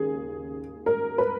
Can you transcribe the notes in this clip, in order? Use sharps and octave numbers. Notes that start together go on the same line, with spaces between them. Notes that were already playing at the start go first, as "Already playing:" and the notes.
Already playing: D#2 C#3 G#4
A#4
B4